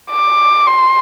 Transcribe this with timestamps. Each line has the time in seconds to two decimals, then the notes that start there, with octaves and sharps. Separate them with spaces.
0.11 D6
0.67 C6